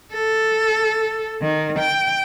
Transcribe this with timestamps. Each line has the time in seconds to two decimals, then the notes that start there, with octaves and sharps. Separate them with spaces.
0.13 A4
1.42 D#3
1.80 G5